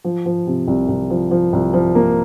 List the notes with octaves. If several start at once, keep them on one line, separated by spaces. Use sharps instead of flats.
F3
F3
C3
C2
C2
F3
F3
C2
F3
A#3